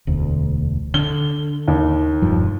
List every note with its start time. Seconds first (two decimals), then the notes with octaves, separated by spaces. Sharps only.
0.07 E1 D2
0.94 D3 G7
1.68 D#2
2.22 E1 G2 F3